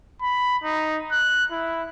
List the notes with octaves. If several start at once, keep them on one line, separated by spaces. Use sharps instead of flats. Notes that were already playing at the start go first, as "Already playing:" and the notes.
B5
D#4
F#6
E4